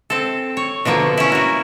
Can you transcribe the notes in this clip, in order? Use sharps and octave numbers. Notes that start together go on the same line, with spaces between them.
C4 A4
C#5
B2 D3 F3 A#3
C#4 E4
F#4 A#4